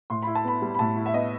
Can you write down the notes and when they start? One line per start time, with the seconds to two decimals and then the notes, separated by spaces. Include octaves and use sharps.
0.10 A2 C6
0.23 E4 B5
0.35 A5
0.45 B3 B5
0.62 G3
0.74 B5
0.79 A2 A5
0.96 E4
1.06 E5
1.14 B3 D#5